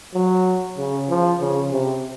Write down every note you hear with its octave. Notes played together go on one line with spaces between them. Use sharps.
F#3
C#3
F3
C#3
C3